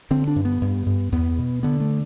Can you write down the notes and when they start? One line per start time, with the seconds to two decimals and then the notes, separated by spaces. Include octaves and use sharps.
0.11 D3 C4
0.28 D4
0.36 G2
0.45 B3
0.62 G2
0.87 G2
1.12 E2 B3
1.38 B2
1.63 D3 B3
1.80 A3